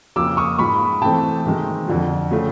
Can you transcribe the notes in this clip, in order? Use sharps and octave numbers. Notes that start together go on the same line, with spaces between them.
F2 C#3 F3 A#3 D6 E6
C#6 D#6
G#2 F3 G#3 B5 C#6
C3 E3 A3 C4 G5 A5
C3 D#3 G#3
F2 D3 F3
C#3 F3 A3